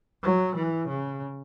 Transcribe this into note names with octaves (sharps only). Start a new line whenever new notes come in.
F#3
E3
C#3